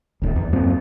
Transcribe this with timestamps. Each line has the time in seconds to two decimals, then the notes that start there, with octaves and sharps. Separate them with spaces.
0.22 D1 D#2
0.36 E2
0.53 F#2 A#3 C4